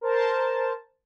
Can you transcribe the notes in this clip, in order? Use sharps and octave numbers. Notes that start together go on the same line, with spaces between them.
A#4 C5 A5